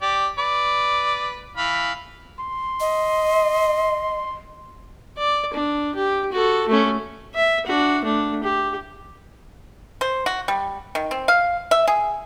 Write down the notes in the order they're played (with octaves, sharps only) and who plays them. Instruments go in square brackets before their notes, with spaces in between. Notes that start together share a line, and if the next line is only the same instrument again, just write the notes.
[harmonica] G4 D5
B4 D5
E3 F5 B5
[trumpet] C6
[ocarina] D#5
[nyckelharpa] D5
D4
G4
F#4 A4
A3 C#4
E5
D4 F#4
A3 D4
G4
[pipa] C5
F#4
G3
D#3
C4
F5
E5
G#4